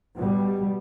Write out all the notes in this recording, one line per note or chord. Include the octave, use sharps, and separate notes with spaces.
B2 G3